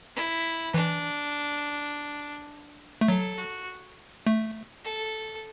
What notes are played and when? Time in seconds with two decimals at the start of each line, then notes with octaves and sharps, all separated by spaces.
0.16 E4
0.74 E3 D4
3.01 A3
3.08 F#3 A4
3.39 F#4
4.27 A3
4.84 A4